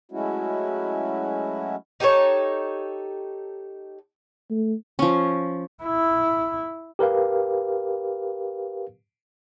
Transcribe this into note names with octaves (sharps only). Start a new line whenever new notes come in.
F#3 G#3 A3 C#4 E4 F#4
D#4 G4 A4 C#5
A3
F3 C#4
E4
G4 A#4 B4 F5